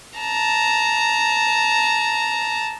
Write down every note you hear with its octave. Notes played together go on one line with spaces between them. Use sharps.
A5 A#5